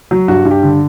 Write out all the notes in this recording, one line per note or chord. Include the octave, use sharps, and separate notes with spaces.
F#3
G2 F#4
G2
G4
D3